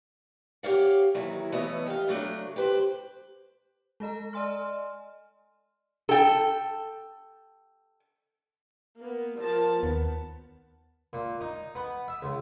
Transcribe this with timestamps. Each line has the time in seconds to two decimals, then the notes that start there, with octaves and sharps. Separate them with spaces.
0.63 G4 C#5 F5 F#5
1.14 D#2 D#3 E3 F#3 E4
1.52 E3 A3 B3 C#5 D#5
1.86 G4 F5
2.08 C#3 F#3 A3 D4
2.56 G4 B4 C5
4.00 G#3 A4 D#5 A#5
4.33 D5 D#5 G#5 C6 F6
6.09 A4 G5
9.00 A#3 B3
9.39 F3 A#4 A5
9.83 D#2 B3
11.13 A#2
11.41 D#4
11.75 B3
12.08 E5
12.22 C#2